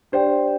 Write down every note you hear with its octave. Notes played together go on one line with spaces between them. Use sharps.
D4 G4 C5 D5 G5